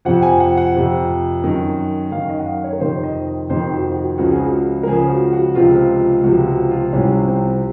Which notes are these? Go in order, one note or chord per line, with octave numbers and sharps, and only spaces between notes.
F2 C3 F3 F#5
G#5
F#5
F#5
F2 C3 F3
F#2 D#3
F#2 D#3 F5
D#5
F#5
F5
C#5
A#4
F2 C3 D#3 C5
D#5
F2 C3 D#3 C5
F#4
F#4
C#2 C#3 F3 F#4
G#4
F#4
A#4
C#2 C#3 F3 G#4
F#4
F#4
C#2 C3 F3 F4
C#2 C3 F3 F#4
F#4
F4
C2 C3 F3 C#4
C4